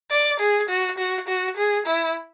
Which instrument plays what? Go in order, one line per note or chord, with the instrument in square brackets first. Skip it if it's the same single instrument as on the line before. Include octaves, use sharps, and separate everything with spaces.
[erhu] D5
G#4
F#4
F#4
F#4
G#4
E4